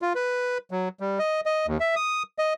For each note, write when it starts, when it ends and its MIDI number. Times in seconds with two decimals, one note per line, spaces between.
0.02 0.13 65
0.15 0.58 71
0.71 0.89 54
1.00 1.19 55
1.19 1.41 75
1.46 1.66 75
1.67 1.78 39
1.80 1.95 76
1.96 2.23 87
2.38 2.53 75